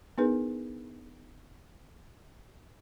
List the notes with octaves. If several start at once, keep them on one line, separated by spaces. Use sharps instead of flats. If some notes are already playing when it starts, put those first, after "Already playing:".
B3 D4 D#4 G#4 A#4 B4